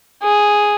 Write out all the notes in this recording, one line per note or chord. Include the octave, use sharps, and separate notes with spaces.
G#4